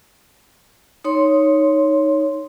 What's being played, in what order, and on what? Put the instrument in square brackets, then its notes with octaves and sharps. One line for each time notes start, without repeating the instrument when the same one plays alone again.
[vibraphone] D#4 C#5 C6